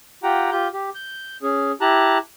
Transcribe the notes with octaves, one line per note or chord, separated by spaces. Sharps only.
F4 G4 F#5 G5 A#5
F4 G4 G6
G4
G6
C#4 G#4
E4 G4 A5 A#5 F#6